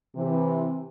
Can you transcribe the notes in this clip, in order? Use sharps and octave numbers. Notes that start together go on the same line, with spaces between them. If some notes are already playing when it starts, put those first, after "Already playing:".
C3 E3